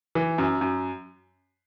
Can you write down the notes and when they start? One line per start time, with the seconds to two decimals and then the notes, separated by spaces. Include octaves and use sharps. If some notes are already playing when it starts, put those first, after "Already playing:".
0.15 E3
0.38 F#2
0.61 F#2